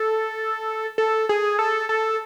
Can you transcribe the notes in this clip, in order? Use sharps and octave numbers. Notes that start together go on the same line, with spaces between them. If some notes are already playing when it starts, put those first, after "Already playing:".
Already playing: A4
A4
G#4
A4
A4